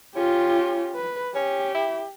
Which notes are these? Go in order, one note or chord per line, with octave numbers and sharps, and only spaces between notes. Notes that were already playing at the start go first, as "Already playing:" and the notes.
C#4 F4 G4
B4
C#4 G4
E4